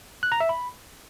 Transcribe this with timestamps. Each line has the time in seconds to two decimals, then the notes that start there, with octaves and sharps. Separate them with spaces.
0.23 F#6
0.32 A#5
0.40 E5
0.49 B5